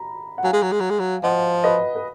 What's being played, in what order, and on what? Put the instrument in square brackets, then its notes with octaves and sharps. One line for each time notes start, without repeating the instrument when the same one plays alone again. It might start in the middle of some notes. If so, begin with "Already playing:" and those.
Already playing: [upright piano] A#5 B5
F#5
[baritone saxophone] F#3 [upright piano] F5 G#5
[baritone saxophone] G#3
F#3
G#3
F#3
G#3
F#3
[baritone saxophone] F3 [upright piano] D#5 F#5
[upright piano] B4 D#5
B4